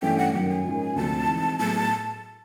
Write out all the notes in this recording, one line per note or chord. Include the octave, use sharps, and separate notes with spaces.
G2 E3 A3 C#4 G5
F#5
F#2 D#3 F#3 A#3 G5
G#5
G#2 F3 A#3 C#4 F4
D2 C3 F3 A5
E3 G#3 C4 D#4
A2 F#3 B3 E4 G#4 A5